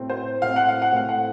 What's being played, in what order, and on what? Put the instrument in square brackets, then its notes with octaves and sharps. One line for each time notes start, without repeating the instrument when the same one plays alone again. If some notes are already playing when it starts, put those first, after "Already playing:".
Already playing: [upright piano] A2 A3 C4
C5
A2 A3 C4 F5
F#5
F5
F#5
A2 A3 C4 F5
F#5